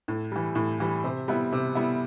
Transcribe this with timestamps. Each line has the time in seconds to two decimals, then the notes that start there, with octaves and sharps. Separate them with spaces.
0.08 A2
0.32 E3 G3
0.55 A2
0.80 E3 G3
1.04 C3
1.28 G3 B3 E4
1.53 C3
1.75 G3 B3 E4